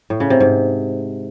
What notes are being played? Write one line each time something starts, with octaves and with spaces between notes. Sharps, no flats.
A2
C#3
C3
G#2